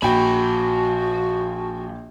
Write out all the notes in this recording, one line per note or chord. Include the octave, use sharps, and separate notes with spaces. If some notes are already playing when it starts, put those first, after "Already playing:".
A#1 F3 F#4 G5 B5